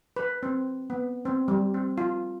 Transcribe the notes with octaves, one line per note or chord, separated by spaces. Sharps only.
B4
C4
B3
C4
G3
C4
F4